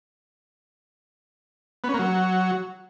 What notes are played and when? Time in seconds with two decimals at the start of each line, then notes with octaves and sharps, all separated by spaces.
1.84 B3
1.89 C#4
1.94 A#3
1.99 F#3